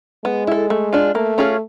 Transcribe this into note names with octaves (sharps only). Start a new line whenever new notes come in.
G#3 B3
E4 A4
A3
D4 F4
A3 A#3
C#4 F4 G#4